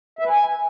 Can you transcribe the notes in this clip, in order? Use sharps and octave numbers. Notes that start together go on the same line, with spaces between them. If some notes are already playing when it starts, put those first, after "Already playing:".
E5
B4
G#5